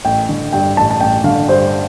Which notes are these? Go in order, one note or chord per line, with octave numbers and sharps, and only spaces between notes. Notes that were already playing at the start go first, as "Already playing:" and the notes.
A1 G5
D3
G2 G5
A1 A5
A5
A1 G5
D3 F5
G2 C5